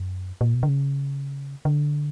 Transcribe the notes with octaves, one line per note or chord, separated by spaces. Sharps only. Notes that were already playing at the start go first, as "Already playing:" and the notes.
Already playing: F#2
A#2
B2
D3
C#3
D3